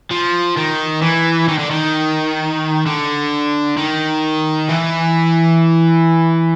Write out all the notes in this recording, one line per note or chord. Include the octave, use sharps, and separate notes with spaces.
F3
D#3
E3
D#3
D3
D#3
D3
D#3
E3